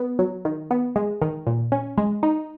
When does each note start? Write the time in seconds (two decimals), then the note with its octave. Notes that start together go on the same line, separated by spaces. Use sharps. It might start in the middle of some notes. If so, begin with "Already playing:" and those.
Already playing: B3
0.19 F#3
0.45 D#3
0.71 B3
0.96 G#3
1.22 D#3
1.47 A#2
1.72 C#4
1.98 G#3
2.23 D#4